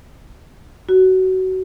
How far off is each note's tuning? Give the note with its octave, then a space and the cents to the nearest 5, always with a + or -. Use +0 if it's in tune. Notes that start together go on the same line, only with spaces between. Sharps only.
F#4 +20